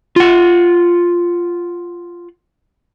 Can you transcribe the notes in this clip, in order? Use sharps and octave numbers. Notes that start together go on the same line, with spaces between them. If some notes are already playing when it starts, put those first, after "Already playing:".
F4 F#5